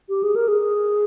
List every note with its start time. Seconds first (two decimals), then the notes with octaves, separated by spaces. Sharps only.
0.09 G4
0.23 G#4
0.36 A#4
0.48 G#4